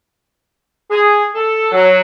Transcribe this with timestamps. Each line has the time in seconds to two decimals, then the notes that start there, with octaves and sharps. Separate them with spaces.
0.90 G#4
1.35 A4
1.72 F#3